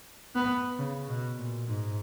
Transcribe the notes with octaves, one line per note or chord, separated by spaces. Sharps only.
B3
C#3
B2
A#2
G#2